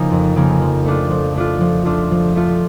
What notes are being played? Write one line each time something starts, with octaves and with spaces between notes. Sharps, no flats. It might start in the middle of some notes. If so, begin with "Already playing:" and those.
Already playing: C#3 F3 A#3 D#4
F2
C#3 F3 A#3 D#4
F3
A3 D4 F4
F3
A3 D4 F4
F3
A3 D4 F4
F3
A3 D4 F4